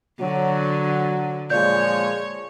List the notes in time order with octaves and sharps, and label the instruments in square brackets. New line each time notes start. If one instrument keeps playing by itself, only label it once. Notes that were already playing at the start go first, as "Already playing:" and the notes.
[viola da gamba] D3 [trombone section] F#3
[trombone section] A#2 F3 G#3 [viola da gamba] C#5 [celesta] D5 G6